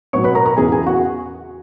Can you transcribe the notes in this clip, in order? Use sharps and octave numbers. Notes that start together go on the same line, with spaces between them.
B2 F#3 B3 C#5 C#6
B4 B5
A#4 A#5
A#4 A#5
E2 C#3 E3 B3 G#4 G#5
G#4 G#5
F#4 F#5